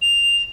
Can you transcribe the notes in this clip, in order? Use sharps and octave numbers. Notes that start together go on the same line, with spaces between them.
F7